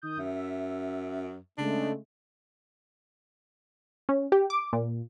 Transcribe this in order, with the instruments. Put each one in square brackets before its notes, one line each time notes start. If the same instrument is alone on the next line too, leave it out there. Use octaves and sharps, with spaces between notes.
[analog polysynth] D#3 D#6 G6
[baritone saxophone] F#2 [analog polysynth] E5
[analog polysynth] C#3 G#3 A3 [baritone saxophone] D4
[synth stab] C#4
G4
D6
A#2